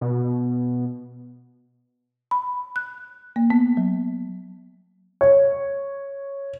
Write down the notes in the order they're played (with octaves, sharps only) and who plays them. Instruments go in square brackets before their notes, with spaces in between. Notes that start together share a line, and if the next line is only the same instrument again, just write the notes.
[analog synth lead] B2
[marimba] B5
F#6
A#3
B3
F#3
[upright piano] C#5